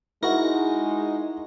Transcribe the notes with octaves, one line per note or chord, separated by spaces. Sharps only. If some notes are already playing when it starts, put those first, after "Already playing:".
G#3 D#4 E4 F#4 A#4